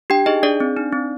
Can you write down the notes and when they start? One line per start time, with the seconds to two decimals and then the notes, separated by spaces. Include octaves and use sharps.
0.10 D4 G4 G5
0.26 D#4 G#4 D#5
0.43 D4 G#4 D5
0.60 C4
0.77 D#4
0.93 C4